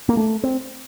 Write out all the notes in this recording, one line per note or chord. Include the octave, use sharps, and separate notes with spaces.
A#3
A3
C4